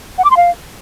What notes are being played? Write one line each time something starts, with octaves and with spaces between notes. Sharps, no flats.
F#5
D6
C6
F5